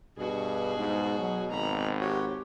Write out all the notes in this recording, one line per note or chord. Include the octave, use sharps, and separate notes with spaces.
G2 B2 F#4 G#4
G#2
F#3
G#1 A#5 B5
F#4 G4 C#5